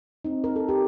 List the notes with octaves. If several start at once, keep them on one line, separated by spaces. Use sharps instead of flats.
C4 D#4
A#4
A4
G4